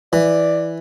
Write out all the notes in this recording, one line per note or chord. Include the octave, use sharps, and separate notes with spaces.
E3 D5